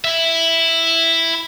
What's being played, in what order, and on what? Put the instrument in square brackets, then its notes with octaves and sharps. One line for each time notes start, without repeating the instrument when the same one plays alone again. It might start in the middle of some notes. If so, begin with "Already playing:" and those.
[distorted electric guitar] E4 E5